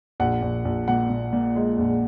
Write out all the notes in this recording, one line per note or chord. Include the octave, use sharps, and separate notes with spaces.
A#1 F#5
A#1
A#1
A#2 F#5
A#2
A#2
G#3
A#1